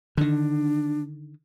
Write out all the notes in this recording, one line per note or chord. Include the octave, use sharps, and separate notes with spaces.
D3 D#3 D4